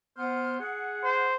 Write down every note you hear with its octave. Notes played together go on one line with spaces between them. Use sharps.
B3 C5 F6
G#4 F#5
C5